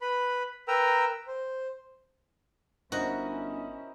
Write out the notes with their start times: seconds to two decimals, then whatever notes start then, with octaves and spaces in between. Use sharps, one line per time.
0.02 B4 B5
0.68 A#4 B4 G5 A#5 E6
1.27 C5
2.92 G1 C#4 E4 F#4 A#4 C5 D#5